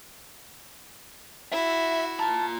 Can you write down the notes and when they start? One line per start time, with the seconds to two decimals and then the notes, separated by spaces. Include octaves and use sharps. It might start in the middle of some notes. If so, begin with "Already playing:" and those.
1.52 E4 F#4 E5
2.19 F4 A5 A#5